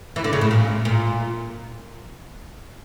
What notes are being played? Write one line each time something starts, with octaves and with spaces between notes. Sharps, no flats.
E3
D3
C#3
A2
A#2
A#2